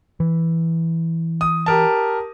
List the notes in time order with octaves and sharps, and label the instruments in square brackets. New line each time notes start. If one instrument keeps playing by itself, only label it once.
[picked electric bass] E3
[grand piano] D#6
G4 A#4 A5